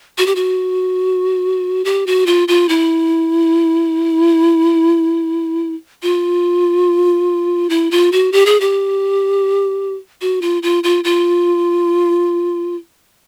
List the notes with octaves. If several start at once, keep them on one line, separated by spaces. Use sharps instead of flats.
F#4
G4
F#4
G4
F#4
F4
F4
E4
F4
E4
F4
F#4
G4
G#4
G4
F#4
F4
F4
F4
F4